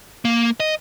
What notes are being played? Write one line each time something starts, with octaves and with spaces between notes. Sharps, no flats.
A#3
D#5